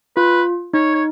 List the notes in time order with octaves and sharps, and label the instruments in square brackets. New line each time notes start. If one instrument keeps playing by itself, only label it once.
[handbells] F4 [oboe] B4
[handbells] D#4 [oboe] C#5
[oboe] C#5